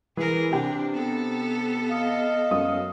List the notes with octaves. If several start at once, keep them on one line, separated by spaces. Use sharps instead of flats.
E3 G#4 A#4
C3 D4 G5
B3 A4
D#5 F5
F#2 D#6